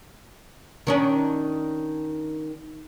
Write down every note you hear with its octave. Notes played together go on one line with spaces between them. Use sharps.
D#3 C#4 D4